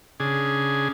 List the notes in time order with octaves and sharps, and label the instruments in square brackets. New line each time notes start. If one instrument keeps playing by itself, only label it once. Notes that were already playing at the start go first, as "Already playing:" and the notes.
[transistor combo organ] C#3 D4 G#4